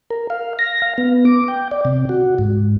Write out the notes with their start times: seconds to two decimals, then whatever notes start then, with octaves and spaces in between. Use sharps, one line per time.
0.10 A#4
0.30 F5
0.59 A#6
0.82 F5
0.98 B3
1.25 D6
1.48 G5
1.71 D5
1.85 C3
2.09 F#4
2.38 G#2